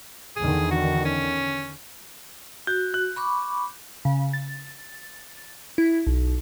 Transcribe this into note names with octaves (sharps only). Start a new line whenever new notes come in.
E2 D3 D#3 G#4
F#4
C#4
F#4 G6
F#6
B5 C#6 D6
C#3
A6
E4
B1